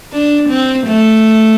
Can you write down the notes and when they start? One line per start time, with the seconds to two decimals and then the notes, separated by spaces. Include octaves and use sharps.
0.13 D4
0.49 C4
0.87 A3